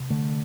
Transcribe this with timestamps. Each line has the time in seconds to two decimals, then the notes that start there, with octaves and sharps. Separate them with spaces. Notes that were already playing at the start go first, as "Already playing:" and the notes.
Already playing: C3
0.10 D3 A3